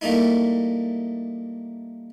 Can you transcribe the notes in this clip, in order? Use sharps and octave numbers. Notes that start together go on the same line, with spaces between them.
G3 A3 A#3 D#4 E4